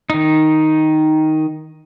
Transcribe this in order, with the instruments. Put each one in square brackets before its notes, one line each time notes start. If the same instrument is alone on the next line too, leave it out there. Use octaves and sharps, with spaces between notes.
[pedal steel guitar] D#3 D#4